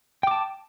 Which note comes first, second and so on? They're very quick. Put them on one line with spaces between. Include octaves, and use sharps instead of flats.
G5 D6 A5